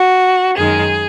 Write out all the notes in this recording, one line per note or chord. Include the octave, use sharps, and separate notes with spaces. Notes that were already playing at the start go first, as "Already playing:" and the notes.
Already playing: F#4
F#2 D#3 G#3 G#4